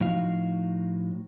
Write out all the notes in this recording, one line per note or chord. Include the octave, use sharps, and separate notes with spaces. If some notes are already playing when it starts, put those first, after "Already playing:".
A2 F3 D#4 F#4 F5